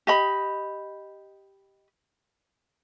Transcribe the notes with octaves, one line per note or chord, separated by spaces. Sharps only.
G4 D#5 B5